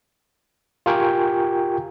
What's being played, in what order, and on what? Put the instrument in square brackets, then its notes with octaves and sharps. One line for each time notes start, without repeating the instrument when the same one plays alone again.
[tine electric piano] F4 G4 A#4 G5 G#5 C#6